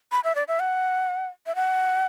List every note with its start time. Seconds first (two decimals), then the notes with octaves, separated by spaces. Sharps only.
0.12 B5
0.24 E5
0.35 D5
0.48 E5
0.60 F#5
1.46 E5
1.55 F#5